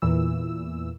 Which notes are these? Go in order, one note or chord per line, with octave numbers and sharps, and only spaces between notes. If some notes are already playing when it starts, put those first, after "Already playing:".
E2 A#2 E3 E6